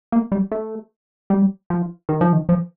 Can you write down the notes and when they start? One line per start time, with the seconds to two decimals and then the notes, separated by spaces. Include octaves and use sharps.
0.12 A#3
0.32 G3
0.52 A3
1.30 G3
1.70 F3
2.09 D#3
2.21 F3
2.33 D#3
2.49 F3